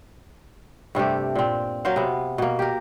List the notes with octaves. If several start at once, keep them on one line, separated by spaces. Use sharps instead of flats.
G2 C3 A3 G4
A#2 C4
F#3 A#4 C5 F5
C3 B3
B2 A#3
G4 A#4